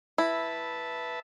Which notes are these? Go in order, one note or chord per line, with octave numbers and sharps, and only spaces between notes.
E4 B4 E5 A5